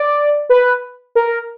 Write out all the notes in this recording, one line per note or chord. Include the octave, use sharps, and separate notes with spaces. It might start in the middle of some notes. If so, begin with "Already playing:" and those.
Already playing: D5
B4
A#4